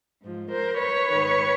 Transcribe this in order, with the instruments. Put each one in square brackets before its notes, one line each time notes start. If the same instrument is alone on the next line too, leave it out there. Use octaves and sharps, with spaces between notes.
[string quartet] G#2 F3
A#4 C5
B4 C#5
G#2 D#3